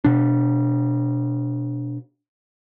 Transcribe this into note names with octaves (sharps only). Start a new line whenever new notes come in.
B2 D4